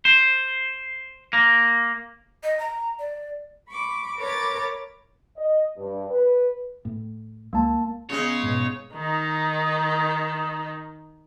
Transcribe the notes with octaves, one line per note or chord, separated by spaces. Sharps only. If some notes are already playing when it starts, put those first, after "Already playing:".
C5
A#3
D#5
A#5
D5
B5 C#6 D6
A#4 B4 C#5 D6 A6
D#5
G2
B4
A2
C#2 G#3 A#3 A5
C#3 G#3 B3 C#5
G#2 B2
D#3 D#4